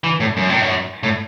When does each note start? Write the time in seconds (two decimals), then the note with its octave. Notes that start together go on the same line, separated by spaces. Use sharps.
0.04 E3
0.20 A2
0.37 F#2
0.50 A2
0.62 F#2
1.03 A2